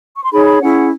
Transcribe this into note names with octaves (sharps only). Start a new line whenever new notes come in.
C#6
C6
D#4 G#4 C#5 B5
B5
C#4 E4 G#4 F#5